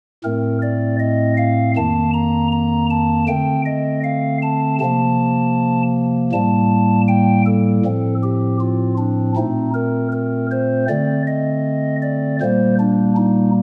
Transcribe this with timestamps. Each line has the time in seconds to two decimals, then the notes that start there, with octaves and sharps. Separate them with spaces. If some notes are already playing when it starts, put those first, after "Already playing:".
0.24 A2 A3 C4 A#4
0.62 D5
0.99 D#5
1.37 F5
1.76 F2 D#3 A#3 A5
2.14 A#5
2.52 A#5
2.90 A5
3.28 D3 A3 C4 G5
3.66 D#5
4.04 F5
4.42 A5
4.80 C3 F3 A#3 A5
6.32 A2 G3 A#3 A5
7.08 G5
7.46 A4
7.85 A2 F3 C4
8.23 G4
8.60 F4
8.98 D4
9.36 A#2 A3 C4 D#4
9.74 A#4
10.12 A#4
10.51 C5
10.88 D3 A3 C4 D5
11.27 D#5
12.02 D5
12.41 A#2 G3 A#3 C5
12.80 D4
13.16 D#4